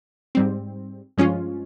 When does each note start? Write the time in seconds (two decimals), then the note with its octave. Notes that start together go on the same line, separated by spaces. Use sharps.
0.35 G#2 G3 C4
1.17 G2 F3 G#3 C#4 F4